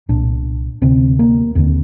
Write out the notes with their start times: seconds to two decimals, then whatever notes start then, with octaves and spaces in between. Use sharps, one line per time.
0.09 C2 A#2 D4
0.82 D2 C3 C4
1.19 A#3
1.55 D#2 D3 C4